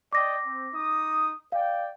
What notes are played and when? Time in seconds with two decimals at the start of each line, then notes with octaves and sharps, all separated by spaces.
0.13 D5 D#5 G5 D6 A#6
0.44 C4
0.73 D#4 D#6
1.52 D5 F5 G5